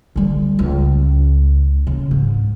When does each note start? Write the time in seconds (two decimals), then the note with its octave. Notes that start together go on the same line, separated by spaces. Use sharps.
0.16 D3 G3
0.59 C#2
1.87 C#3
2.11 G#2